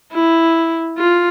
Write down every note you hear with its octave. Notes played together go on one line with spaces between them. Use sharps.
E4
F4